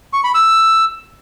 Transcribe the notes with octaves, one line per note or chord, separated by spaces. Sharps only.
C#6
B5
E6